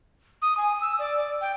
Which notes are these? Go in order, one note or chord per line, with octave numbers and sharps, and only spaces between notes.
D#6
G#5
E6
D5
D5
G5